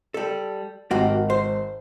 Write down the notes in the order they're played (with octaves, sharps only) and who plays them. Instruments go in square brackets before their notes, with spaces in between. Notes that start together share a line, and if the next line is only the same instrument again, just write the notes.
[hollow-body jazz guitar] G3 A4
[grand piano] G#1 [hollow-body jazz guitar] A#3 F#4 G4
[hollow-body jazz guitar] C5